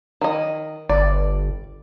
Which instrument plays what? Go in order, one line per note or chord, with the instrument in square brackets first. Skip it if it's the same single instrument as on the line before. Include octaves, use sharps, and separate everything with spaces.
[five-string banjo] D#3 D#5
[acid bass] G1 [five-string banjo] D5